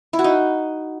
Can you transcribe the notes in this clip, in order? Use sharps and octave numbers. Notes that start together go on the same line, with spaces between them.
E4
F#4
D#4